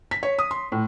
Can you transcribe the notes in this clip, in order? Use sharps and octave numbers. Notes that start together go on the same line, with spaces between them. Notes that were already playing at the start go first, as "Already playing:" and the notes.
B6
C#5
D#6
C6
A2